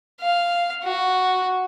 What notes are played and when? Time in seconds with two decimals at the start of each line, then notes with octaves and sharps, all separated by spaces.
0.21 F5
0.83 F#4